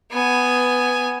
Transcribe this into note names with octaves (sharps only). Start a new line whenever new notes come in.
B3 G#5